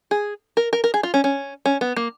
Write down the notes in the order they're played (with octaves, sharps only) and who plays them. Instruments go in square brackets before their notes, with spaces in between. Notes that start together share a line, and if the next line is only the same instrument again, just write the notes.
[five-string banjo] G#4
A#4
A#4
A#4
G#4
F4
C#4
C#4
C#4
B3
A#3